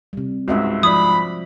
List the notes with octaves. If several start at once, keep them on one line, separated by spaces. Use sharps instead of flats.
C3 G3
C#2 G#2 F#4 D#5 E5
F3 D5 B5 D#6